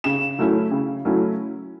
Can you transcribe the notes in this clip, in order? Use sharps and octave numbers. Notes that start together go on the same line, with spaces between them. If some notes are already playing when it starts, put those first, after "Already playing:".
C#3 E7
F#3 A3 C#4 E4
C#3
F#3 A3 C#4 E4